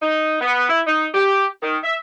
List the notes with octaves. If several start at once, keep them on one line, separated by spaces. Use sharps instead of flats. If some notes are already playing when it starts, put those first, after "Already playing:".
D#4
B3
E4
D#4
G4
D#3
E5